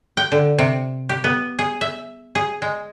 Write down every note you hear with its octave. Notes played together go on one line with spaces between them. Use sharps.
G5
D3
C3
G4
B3
G#4
E5
G#4
G#3